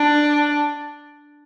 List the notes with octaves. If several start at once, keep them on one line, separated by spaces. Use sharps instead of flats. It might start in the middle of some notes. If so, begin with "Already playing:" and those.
Already playing: D4